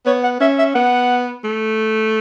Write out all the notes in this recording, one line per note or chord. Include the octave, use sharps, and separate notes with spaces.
B3 C#5
F#5
C#4 E5
E5
B3 F#5
A3